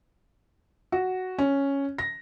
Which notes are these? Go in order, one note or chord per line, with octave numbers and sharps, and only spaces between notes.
F#4
C#4
A#6